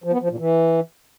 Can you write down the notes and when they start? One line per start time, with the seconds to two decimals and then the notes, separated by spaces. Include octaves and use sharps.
0.04 F3
0.13 B3
0.21 F3
0.30 A#2
0.39 E3